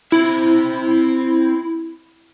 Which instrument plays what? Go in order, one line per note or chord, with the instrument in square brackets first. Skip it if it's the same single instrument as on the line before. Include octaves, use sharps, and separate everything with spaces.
[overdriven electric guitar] C4 E5 [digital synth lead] E4